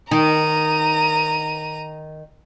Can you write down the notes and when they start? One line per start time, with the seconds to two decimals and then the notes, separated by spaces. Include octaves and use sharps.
0.11 D#3 A#5 D#7